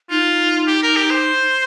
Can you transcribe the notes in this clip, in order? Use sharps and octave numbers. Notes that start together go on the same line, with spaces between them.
D#4 F4
G4
A#4
G4
C5